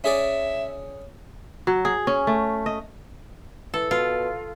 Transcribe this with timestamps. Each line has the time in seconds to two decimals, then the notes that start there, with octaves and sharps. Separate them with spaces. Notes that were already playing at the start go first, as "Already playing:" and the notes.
0.04 C#4 G#4 D5 E5
1.67 F#3
1.85 G#4
2.07 C#4
2.27 A3
2.66 D#5
3.74 E3 A4
3.91 B2 F4